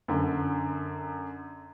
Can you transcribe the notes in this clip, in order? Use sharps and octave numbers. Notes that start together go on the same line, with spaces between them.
F#2 D3